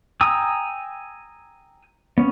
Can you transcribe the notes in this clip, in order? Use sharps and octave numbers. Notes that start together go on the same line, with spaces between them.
G5 G#5 A#5 D#6 E6
B3 C#4